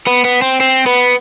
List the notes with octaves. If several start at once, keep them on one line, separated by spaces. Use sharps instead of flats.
B3
B3
C4
C4
B3